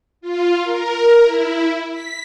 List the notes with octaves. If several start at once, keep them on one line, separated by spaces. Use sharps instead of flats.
F4
A#4
E4
B6